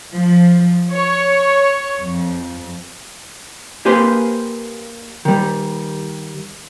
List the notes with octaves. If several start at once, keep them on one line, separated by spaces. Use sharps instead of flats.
F3
C#5
F2
A#3 G4 G#4 B4 C5
D#3 G3